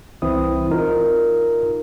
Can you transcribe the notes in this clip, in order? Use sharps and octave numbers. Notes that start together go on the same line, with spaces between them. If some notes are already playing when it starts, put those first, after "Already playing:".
C2 E3 C4 E4 D#6
D#4 F4 A#4